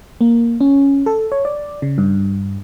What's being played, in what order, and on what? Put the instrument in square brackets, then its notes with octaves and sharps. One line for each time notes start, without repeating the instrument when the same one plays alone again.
[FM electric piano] A#3
C#4
A4
C#5
D5
C#3
G2